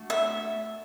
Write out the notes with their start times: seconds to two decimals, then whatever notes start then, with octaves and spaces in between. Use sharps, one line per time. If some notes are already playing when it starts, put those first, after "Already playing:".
Already playing: A3 D4 F#4
0.10 E5